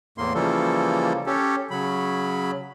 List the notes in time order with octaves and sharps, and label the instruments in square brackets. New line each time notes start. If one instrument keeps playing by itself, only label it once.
[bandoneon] E2 A2 A#3 C6
C#3 E3 F3 G3 A#3 A4
C#4 G4 A4
C#3 F#3 B5